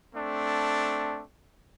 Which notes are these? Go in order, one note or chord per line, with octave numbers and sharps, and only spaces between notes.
A3 C4 D4